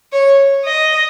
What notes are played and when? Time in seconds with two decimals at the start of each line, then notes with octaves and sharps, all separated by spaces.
0.12 C#5
0.65 D#5